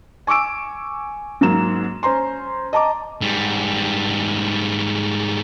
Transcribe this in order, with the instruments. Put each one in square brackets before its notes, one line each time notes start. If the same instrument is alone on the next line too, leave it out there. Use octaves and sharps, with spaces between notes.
[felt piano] G#5 C#6 D6 E6 D7
G#2 F#3 A#3 A#5 E7
C#4 C5 A#5 C6
D#5 A5 A#5 D6
[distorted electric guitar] G#2 G3